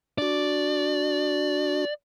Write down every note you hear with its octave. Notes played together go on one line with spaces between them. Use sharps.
D4 F#4 D5